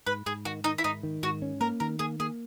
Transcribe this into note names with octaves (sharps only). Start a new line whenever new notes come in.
G#2 B4
G#2 G#4
D#3 F#4
D#3 D#4
E4
G#2 D#4
D#3
G#2 F#4
C#4
A#3 A#4
D#3 A#4
A#3 G#4
A#3 G#4